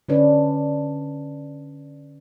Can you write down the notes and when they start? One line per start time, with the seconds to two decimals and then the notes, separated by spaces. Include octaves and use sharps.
0.09 D3 C#4 D4 B4